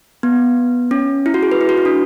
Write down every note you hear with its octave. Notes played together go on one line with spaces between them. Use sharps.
B3
C#4
E4
F#4
G#4
B4
E4
F#4
E4
D4